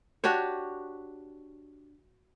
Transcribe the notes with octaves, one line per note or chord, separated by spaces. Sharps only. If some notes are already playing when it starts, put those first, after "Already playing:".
D4 F#4 G4 C#5